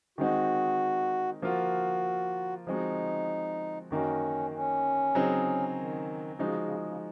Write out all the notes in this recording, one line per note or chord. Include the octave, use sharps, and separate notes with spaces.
D#3 G#3 C4 D#4 F#4
F3 A#3 F4 F#4
F3 G#3 C4 D#4 F#4
F#2 D#3 A#3 C#4 D#4 F#4
C#4
C#3 F#3 C4 D#4 G#4
D#3
C#3 F3 G#3 D#4 F#4
C#3
C#3